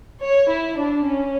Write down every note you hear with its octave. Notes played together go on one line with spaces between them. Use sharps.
C#5
E4
D4
C#4